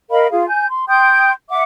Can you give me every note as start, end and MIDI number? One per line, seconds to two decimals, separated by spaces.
0.11 0.27 70
0.11 0.27 75
0.11 0.27 77
0.11 0.27 83
0.31 0.45 65
0.31 0.45 68
0.31 0.45 77
0.48 0.67 80
0.48 0.67 91
0.70 0.84 84
0.88 1.32 79
0.88 1.32 84
0.88 1.32 87
0.88 1.32 91
1.49 1.63 76
1.49 1.63 78
1.49 1.63 86